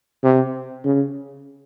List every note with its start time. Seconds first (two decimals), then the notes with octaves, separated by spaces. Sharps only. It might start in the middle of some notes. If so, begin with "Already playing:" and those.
0.24 C3
0.85 C#3